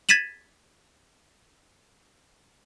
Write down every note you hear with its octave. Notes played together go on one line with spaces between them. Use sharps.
G#6 A6 B6 D#7 E7 F#7